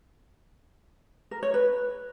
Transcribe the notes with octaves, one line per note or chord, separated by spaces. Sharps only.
A#4
C#5
B4